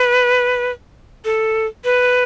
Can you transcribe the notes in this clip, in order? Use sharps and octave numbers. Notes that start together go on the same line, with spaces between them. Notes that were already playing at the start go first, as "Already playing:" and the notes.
Already playing: B4
A4
B4